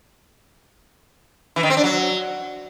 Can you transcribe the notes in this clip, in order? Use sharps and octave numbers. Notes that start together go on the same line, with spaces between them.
E3
D#3
C4
D4
F#3